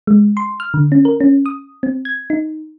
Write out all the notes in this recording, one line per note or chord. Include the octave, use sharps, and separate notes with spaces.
G#3
C6
F6
D3
C#4
A#4
C#4
D#6
C4
G#6
D#4